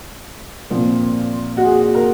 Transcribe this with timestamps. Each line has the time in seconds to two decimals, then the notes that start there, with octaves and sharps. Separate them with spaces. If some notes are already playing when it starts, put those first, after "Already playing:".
0.71 A#2 F3 C4
1.57 F#4
1.64 G#4
1.95 A#4